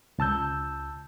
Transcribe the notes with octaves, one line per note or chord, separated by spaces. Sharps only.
C#2 A5 E6 G6